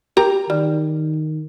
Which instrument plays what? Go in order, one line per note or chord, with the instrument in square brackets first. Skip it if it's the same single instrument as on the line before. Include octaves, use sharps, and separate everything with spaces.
[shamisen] G4 A#4 A#5
[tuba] D#3 [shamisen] G3